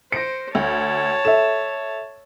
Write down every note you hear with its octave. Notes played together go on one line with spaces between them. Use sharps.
C5 A#6 C#7 D7
D2 C#5 A5
A4 E5 E7